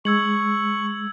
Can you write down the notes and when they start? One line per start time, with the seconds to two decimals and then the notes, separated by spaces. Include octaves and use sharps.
0.05 G#3 C#6 E6 G#6 F#7